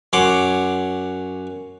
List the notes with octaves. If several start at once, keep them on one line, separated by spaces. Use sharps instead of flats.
F#2 C#5 F#5 C6 D6